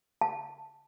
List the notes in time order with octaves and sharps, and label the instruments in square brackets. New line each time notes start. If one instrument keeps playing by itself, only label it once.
[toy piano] A5